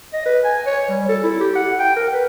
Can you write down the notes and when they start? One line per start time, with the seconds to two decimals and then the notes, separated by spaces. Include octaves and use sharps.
0.13 D#5
0.26 B4
0.45 G#5
0.66 C#5
0.89 G3
1.09 A4
1.23 E4
1.40 G4
1.55 F#5
1.79 G5
1.96 A#4
2.13 B4